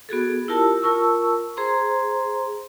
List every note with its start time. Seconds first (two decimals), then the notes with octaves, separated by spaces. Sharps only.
0.09 B3 F#4 G#4 A4
0.48 E4 F4 G4 A#4 A5 E6
0.82 F4 A#4 A5 C#6 E6
1.57 G#4 C5 A#5 C6